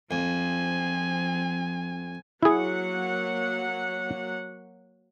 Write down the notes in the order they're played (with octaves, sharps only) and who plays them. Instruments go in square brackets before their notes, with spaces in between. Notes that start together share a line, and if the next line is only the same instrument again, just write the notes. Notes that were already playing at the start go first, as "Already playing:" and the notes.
[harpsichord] F2 [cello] F3 [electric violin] C4 G#5
[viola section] F#3 A#3 F#5 [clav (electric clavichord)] E4 G#4